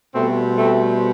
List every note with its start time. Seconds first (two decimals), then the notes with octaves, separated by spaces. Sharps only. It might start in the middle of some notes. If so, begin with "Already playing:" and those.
0.14 B2 G3 A3 C4
0.57 A3 C4